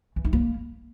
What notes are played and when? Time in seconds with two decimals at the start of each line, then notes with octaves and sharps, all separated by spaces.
0.16 E3
0.25 D#4
0.33 A#3